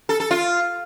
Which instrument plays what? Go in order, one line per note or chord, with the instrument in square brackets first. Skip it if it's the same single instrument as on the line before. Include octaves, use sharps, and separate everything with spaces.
[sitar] A4
A4
F4